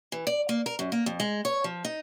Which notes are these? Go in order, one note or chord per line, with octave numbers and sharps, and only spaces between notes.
E3
D5
A#3
A#4
F#2
A#3
F2
G#3
C#5
F3
D#4